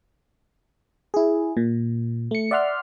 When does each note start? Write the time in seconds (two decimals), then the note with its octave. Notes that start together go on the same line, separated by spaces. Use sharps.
1.14 E4 G#4
1.57 A#2
2.31 A3 C#7
2.51 D5 E5 F#5 C6 F6